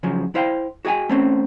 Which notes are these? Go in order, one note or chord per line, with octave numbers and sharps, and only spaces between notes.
C#3 F3 F#3
E4 C5 F5 G5
F#4 G#4 D#5 G5 G#5
A3 C4 C#4